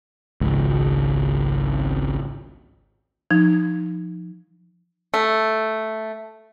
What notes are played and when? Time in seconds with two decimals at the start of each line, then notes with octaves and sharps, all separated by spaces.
0.41 G#1 C#2
3.31 F3 D#4
5.14 A3